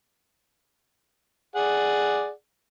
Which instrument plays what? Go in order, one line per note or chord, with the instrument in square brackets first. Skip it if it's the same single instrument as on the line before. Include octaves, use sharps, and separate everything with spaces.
[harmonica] G#4 D5 F#5